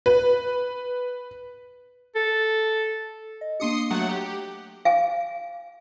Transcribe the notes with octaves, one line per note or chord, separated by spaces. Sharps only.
B4
A4
D#5
A#3 D4 G4 C6 D#6 C#7
F#3 A3 F#5
G4 A#5
F5 G#5